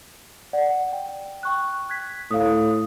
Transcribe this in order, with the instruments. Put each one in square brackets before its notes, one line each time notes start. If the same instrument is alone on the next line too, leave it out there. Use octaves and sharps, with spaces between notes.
[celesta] D5 F#5
G5
G5 C#6 F#6
F#6 G#6 B6
[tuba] A2 [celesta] F5 D#6